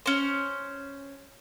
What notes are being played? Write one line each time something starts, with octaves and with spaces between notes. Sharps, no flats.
C#4 C5